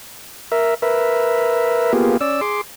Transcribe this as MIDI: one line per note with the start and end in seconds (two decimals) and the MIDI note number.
0.52 0.74 70
0.52 0.74 76
0.82 1.93 70
0.82 1.93 71
0.82 1.93 76
1.93 2.17 58
1.93 2.17 59
1.93 2.17 65
1.93 2.17 67
1.93 2.17 68
2.21 2.41 61
2.21 2.41 74
2.21 2.41 88
2.41 2.61 68
2.41 2.61 84
2.41 2.61 86